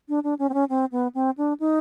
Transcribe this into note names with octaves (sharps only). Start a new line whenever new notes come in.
D4
D4
C#4
C4
C#4
C4
B3
C4
D4
D#4